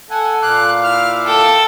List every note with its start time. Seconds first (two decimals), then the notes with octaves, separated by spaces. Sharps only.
0.10 A4 F#5 G#5
0.42 A#2 F5 D6 F#6
0.83 E4 F6
1.26 A4 G5 E6